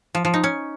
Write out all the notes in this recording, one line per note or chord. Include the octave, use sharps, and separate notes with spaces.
F3
F3
D#4
C#4